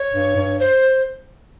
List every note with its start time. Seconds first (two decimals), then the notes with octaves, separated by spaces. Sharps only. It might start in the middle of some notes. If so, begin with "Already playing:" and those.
Already playing: C#5
0.13 G2
0.36 G2
0.59 C5